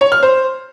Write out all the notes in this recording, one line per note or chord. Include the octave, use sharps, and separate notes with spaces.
C#5
F6
C5